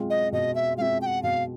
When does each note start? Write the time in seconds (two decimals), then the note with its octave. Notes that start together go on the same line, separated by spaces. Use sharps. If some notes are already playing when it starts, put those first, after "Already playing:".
Already playing: B2 G#3 C4 F4
0.10 D#5
0.32 B2 D#5
0.55 E5
0.78 G#3 C4 F4 E5 F5
1.01 G5
1.06 F#5
1.23 B2 F5